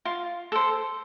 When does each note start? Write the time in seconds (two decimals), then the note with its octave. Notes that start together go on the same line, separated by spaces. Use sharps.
0.05 F4
0.52 A4 C5